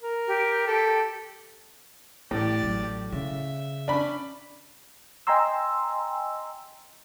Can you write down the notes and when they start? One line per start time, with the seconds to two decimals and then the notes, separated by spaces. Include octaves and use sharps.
0.02 A#4
0.27 G4
0.67 A4
2.31 A1 A2 G4 D5
2.63 A1 F#3
3.12 C#3 E5
3.88 C#4 D4 B5
5.27 D#5 G5 G#5 A#5 C6 E6